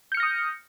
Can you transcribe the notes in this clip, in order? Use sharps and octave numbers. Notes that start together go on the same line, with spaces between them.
D#6 F6 G6 A#6 C#7